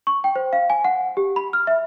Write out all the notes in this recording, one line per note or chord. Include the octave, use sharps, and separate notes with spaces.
C#6
G5
C5
F5
G#5
F#5
G4
B5
F6
E5